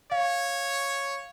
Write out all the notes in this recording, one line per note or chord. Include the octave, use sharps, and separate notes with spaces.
C#5 F5